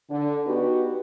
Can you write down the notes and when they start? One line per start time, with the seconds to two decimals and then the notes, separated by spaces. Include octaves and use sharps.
0.11 D3
0.47 B3 D#4 F#4 G4